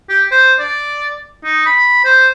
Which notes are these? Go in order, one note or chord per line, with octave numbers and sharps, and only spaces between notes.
G4
C5
D5
D#4
B5
C5